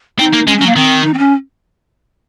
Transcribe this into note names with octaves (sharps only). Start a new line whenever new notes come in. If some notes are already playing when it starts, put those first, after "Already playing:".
C4 D#4
A#3
G#3 C#4
F#3 C#4
A#3
D#3 C4
D#4
C4
C#4